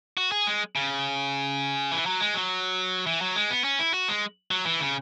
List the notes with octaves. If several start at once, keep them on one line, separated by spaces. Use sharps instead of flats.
F#4
G#4
G#3
C#3
E3
F#3
G#3
F#3
E3
F#3
G#3
B3
C#4
E4
F#4
G#3
F#3
E3
C#3